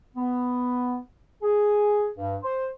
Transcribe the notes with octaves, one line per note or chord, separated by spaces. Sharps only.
B3
G#4
G2
C5